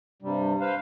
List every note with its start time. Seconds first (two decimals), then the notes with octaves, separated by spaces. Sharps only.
0.22 G2 C3 G3
0.61 B4 C5 F5